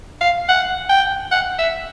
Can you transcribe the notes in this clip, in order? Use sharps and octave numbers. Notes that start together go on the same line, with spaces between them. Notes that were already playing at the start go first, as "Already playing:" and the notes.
F5
F#5
G5
F#5
E5